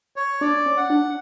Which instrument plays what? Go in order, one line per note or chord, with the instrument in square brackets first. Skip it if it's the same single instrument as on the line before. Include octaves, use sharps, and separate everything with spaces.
[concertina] C#5
[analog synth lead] D4 [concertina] D5
[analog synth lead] C#4
[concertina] F#5
[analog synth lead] D4